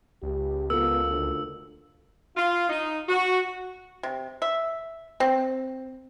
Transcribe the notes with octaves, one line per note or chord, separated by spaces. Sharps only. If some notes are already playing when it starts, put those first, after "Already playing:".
C#2 G4
B3 F4 A4 A#4 E6
D2
F4
D#4
F#4
C3
E5
C4